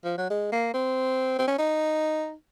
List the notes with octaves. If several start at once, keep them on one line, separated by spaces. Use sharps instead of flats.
F3
F#3
G#3
A#3
C4
C4
C#4
D#4